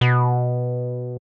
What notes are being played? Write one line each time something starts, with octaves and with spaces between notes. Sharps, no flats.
B2